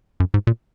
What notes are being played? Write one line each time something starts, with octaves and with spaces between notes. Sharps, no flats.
F#2
G#2
A#2